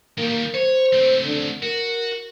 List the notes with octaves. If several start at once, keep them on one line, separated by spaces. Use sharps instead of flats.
D#3 G3 A#3
C5 C#5
A3 C4
D3
F#4 A#4